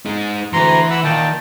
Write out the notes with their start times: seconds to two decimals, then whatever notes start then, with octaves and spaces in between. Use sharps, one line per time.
0.05 G#3 D#4
0.53 D2 E3 A#5 C6
0.91 F#5 B5 E6
1.04 A#2 D#3 G5 A5